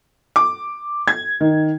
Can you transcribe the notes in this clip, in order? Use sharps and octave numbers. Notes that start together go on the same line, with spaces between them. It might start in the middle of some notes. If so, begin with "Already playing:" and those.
D6
G#6
D#3